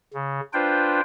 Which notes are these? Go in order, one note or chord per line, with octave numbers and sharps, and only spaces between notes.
C#3
D4 F4 B4 C5 G5